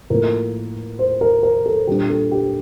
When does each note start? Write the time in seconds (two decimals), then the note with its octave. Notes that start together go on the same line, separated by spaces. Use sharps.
0.10 A2 F3 A#3 A#4
0.99 C5
1.21 A#4
1.43 A#4
1.66 A4
1.87 A#2 G3 D4 G4
2.10 A4
2.31 G4